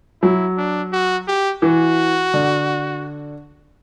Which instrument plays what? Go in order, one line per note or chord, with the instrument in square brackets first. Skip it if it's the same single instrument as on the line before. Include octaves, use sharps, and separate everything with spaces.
[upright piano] F#3 [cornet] E4
[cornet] D4
F#4
G4
[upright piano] E3 [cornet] F#4
[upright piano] D3